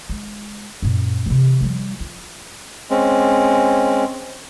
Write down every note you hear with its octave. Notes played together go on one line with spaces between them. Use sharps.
G#3
F#2 A#2
C3 E3
F3 G3
F4
G#3 C4 C#4